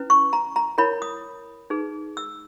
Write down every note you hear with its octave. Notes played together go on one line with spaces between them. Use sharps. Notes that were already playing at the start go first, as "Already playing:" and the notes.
Already playing: C#4 E4 B4
C#6
A#5
A#5
E4 A#4 C#5 B5
D#6
D#4 G#4 B4
E6